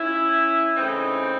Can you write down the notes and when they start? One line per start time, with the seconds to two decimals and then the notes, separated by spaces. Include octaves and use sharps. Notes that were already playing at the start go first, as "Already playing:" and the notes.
Already playing: C#4 E4
0.76 C#3 E3 A3 C4 D#4